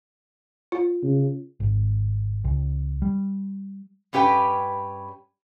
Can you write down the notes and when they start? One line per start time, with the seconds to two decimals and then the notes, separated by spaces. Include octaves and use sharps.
0.72 F4
1.03 C#3
1.60 G#1
2.44 C#2
3.02 G3
4.13 G2 C#4 G4 B4 G5